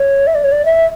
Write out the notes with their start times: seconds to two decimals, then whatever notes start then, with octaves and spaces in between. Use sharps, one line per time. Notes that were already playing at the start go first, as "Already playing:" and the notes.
Already playing: C#5
0.27 E5
0.35 D5
0.44 C#5
0.52 D5
0.65 E5